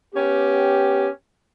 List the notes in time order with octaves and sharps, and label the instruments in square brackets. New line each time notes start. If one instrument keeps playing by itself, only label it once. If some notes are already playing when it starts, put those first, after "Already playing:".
[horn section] B3 C#4 G4